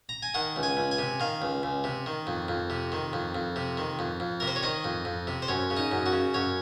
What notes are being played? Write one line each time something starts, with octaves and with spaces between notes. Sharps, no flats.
A#5
G#5
D#3 F#5
C#2
G#5
C#2
G#5
C3
D#3 F5
C#2
C#2
C3
D#3
F2
F2
C3
D#3
F2
F2
C3
D#3
F2
F2
C3 A#4
C5
C#5
D#3 D#5
F2
F2
C3
C5
F#2 C#5
C#3
D#4
F#2
F#4
C#3
F#2 C#5